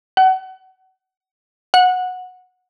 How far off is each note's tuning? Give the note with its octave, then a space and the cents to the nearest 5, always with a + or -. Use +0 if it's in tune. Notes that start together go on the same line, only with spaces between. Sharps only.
F#5 +35
F#5 -15